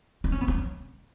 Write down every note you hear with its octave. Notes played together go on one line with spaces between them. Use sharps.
D#4
C#4
B3
C#4